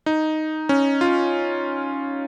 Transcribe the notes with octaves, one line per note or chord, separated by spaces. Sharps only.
D#4
C#4
F4